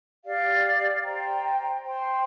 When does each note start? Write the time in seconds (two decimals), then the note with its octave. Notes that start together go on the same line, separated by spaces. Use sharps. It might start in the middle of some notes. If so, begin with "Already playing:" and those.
0.25 G4 D5 F5
1.03 C5 G5 A#5
1.82 C5 G5 C6